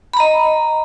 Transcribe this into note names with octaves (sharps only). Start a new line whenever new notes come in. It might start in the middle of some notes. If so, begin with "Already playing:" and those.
D#5 A#5 B5